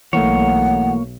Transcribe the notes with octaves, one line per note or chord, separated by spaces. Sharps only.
B1 E3 A3 A#3 C#5 F#5